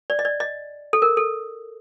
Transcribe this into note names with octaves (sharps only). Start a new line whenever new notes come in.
D5
D#5
D5
D#5
A4
A#4
A4